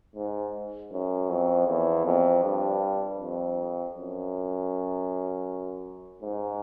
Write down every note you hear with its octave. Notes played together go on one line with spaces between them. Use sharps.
G#2
F#2
F2
E2
F2
G2
F2
F#2
G#2